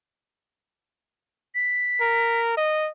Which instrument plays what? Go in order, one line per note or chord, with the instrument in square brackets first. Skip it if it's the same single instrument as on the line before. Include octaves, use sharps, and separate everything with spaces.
[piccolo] B6
[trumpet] A#4
D#5